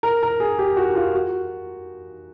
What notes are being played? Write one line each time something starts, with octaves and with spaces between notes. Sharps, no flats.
A#4
A#4
G#4
G4
F#4
F4
F#4